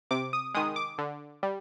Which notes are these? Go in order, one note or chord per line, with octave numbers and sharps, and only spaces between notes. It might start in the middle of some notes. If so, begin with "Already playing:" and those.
C3 D6
D#6
D#3 G#3 D#6
D6
D3
G3